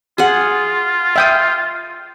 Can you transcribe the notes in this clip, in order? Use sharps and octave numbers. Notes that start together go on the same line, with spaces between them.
F4 G#4 F#5
E5 G5 D#6